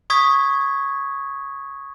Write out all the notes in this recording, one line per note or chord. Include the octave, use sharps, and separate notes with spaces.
C#6 D#6 G#6 B6